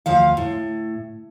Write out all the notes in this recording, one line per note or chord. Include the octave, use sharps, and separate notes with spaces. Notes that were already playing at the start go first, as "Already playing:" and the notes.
D2 F3 F5
A2